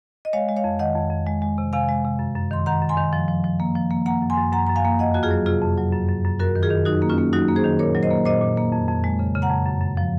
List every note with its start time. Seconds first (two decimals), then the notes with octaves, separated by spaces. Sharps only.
0.25 D#5
0.33 G#3 C#5 F5
0.49 G#3
0.57 C#5 F5
0.64 F2
0.79 D#3 D#5 F#5
0.95 F2
1.11 F2
1.26 G#3
1.42 G#3
1.58 C3
1.73 C3 F5 G#5
1.89 G#3
2.04 C3
2.19 F#2
2.36 F#2
2.51 D#3 C6
2.66 D#3 F#5 A#5
2.82 F#2
2.89 G#5 C6
2.97 D#3
3.13 F3
3.28 F3
3.44 F3
3.60 A#3
3.75 F3
3.91 A#3
4.06 A#3 F#5 A#5
4.22 F#2
4.30 G#5 C6
4.37 F#2
4.52 F#2 F#5 A#5
4.67 F#2 A#5
4.76 F5 G#5
4.85 A#3
4.99 F2 D#5 F#5
5.14 F2 F#4
5.23 F4 G#4
5.31 F#3
5.46 C3 F4 G#4
5.62 F2
5.78 F#3
5.93 F#2
6.08 F#2
6.25 F#2
6.39 F#2 F#4 A#4
6.56 D#3
6.63 F4 G#4
6.70 D#3
6.85 F#3 D#4 F#4
7.02 A#3
7.10 C#4 F4
7.18 A#3
7.33 F#3 D#4 F#4
7.48 A#3
7.56 G#4 C5
7.64 D#3
7.79 A#2 A#4 C#5
7.95 F#3
8.03 C5 D#5
8.10 A#3
8.25 A#2 C5 D#5
8.41 A#2
8.57 A#3
8.73 F2
8.88 F2
9.04 G#3
9.19 C#3
9.35 C#3
9.42 F#5 A#5
9.50 F2
9.65 F#2
9.81 F#2
9.97 F3